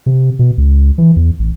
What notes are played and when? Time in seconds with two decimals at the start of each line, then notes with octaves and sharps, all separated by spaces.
0.06 C3
0.39 B2
0.58 C#2
0.98 E3
1.16 E2
1.39 A1